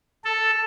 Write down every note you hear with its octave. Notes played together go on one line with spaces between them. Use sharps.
A4